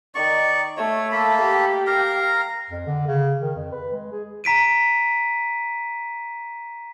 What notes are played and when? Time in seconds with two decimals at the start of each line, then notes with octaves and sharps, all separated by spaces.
0.15 D#3 D5 C#6
0.77 A3 C#5
1.12 A#3 A4 B5
1.41 G4
1.87 A#4 F5 A#5
2.70 F2
2.87 D3
3.07 C#3
3.41 D#3
3.56 F2
3.72 B4
3.93 G#3
4.12 G#4
4.44 A#5 B6 D7 D#7